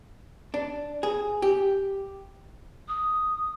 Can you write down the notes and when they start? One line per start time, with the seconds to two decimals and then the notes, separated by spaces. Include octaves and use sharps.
0.54 D4
1.03 G#4
1.42 G4
2.88 D#6